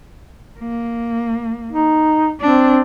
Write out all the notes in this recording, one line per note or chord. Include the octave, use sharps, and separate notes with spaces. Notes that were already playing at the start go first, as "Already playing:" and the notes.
A#3
D#4
C4 D4